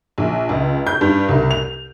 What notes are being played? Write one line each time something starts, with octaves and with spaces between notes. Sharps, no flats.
A#1
C#2
G6
G2
C2
F7